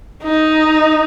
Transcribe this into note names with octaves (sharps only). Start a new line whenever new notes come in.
D#4